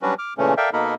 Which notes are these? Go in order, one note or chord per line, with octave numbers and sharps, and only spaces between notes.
F#3 G3 C#4 D4 F#4 B4
D6 F6
A#2 C#3 E3 A3 C#4
A4 A#4 D5 E5 F5 G5
B2 A#3 D#4 A4 A#4 B5